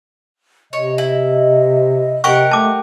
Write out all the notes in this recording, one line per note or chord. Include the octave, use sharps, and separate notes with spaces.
C3 C#5 D#5
E4
C3 G4 A#4 F#5 C#6
A3 A5 D6